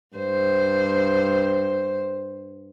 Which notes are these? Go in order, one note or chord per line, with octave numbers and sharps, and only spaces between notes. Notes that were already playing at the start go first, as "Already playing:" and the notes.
G2 C5